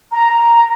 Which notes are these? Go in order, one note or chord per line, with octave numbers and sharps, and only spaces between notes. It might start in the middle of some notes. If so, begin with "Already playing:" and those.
A#5